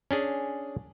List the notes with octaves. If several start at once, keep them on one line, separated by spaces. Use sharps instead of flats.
C#4 D4 G#4